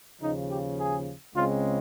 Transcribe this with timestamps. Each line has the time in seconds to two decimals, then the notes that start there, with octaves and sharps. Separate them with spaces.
0.21 D#2 C#3 F3 D#4
0.50 G4
0.78 G#4
1.35 C#2 C#3 G#3 C4 F4